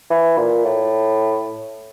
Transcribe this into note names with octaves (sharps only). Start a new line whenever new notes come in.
E3
A#2
A2